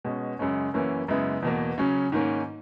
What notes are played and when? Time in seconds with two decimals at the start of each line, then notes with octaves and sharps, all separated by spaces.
0.05 B2 G#3 C#4
0.39 F#2 C#3 G#3 C#4
0.74 F#2 E3 A#3 C#4 E4
1.08 F#2 C#3 G#3 B3 E4
1.42 E2 B2 A#3
1.78 C#3 F#3 C#4
2.12 G#2 D#3 A#3 C#4